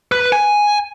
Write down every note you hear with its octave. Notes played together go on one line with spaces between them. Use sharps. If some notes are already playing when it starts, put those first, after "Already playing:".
B4
G#5